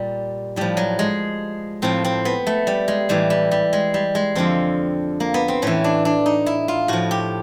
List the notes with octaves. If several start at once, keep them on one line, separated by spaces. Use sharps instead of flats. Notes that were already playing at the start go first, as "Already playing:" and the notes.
Already playing: A#2 G3
A2 F3 G3
F#3
G#3
A2 F3 C4
C4
B3
A3
G3
G#3
A2 E3 G3
G3
G3
G#3
G3
G#3
F2 D3 F3 C4
A#3
B3
C4
A2 E3 C#4
D4
D4
D#4
E4
F4
A2 F3 F#4
G4